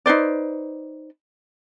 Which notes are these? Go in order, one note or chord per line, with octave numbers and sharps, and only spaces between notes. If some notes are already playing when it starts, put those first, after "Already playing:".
D#4 B4 C5 D5